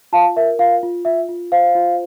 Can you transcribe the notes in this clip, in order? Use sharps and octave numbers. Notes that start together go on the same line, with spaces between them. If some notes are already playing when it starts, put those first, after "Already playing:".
F4 F5 A5
A#4 E5
F4 F5
F4
F4 E5
F4
C5 F5
F4